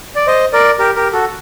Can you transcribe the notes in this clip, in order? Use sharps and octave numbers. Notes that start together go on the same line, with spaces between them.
D5
C5 D#5
A#4 D5
G4 A#4
G4 A#4
F#4 A4